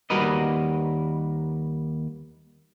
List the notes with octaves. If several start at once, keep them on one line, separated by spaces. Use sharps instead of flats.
D#2 G3 F#4 A#4 B4 D#5